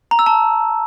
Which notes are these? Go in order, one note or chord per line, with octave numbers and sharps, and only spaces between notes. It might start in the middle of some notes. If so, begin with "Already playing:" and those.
A#5
E6
A5